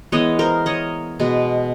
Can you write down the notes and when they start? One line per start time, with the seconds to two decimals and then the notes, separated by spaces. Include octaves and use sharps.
0.12 E3 G#3 B3 C#5 D#5
0.39 A#4 C5
0.66 C#5 D#5
1.20 B2 G#3 B3